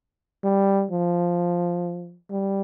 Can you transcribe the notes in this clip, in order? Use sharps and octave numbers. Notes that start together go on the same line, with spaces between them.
G3
F3
G3